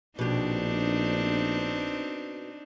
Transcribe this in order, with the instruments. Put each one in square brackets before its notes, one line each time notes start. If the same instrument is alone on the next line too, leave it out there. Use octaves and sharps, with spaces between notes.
[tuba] A#1 [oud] B2 G4 [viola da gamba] C4 D4 D#4